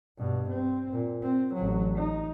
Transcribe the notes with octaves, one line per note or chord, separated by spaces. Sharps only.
G2 B2
C4
A#2
C4
A1 F#3
D#4